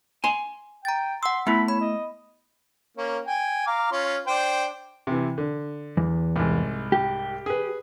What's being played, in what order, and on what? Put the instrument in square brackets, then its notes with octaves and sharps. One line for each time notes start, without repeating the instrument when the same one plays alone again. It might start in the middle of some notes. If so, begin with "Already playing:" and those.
[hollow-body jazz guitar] G#5 C6
[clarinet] G5 [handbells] A#5 A6
[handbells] F#5 E6 [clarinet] C6
[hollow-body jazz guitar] A3 [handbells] B3 E4 [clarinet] B5
[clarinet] C#5 [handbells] B5
[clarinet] D#5
[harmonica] A#3 C#4
G5 G#5
F5 A#5 D6
C#4 F4 C6
D4 C5 G5
[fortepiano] C3 E3
D3
[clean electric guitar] E2
[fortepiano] C2 G#2
[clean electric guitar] G4
[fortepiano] G#4 B4